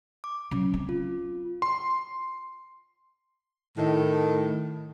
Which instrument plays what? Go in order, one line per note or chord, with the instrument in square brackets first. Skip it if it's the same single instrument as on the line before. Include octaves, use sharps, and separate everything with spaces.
[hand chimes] D6
[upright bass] C#3 F#3
C4
[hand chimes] F4
[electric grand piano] C6
[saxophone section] A2 D#3